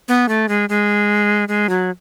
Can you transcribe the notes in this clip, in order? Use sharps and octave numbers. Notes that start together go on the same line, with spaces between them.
B3
A3
G#3
G#3
G#3
F#3